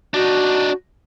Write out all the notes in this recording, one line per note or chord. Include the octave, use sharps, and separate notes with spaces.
D4 D#4 F#4